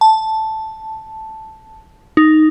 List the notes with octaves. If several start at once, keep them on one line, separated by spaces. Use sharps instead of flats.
A5
D#4